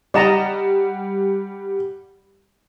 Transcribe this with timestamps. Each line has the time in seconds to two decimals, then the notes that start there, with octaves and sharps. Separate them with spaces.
0.14 G3 D5 D#5 F#5 A#5 E7